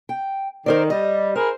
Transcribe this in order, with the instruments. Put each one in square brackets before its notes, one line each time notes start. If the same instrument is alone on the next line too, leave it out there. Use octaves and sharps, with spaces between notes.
[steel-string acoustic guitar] G5
[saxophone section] D#3 [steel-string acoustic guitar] A#4 C5 D5
[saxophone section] G3 [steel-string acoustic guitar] D#5
[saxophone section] E4 G#4 A#4 [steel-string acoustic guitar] C5